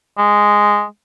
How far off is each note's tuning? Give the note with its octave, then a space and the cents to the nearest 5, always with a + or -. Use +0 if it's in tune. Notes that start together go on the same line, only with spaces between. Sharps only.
G#3 -5